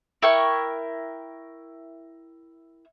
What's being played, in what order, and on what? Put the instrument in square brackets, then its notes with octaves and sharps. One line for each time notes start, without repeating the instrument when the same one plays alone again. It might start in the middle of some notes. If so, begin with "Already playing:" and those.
[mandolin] E4 A#4 G5 C#6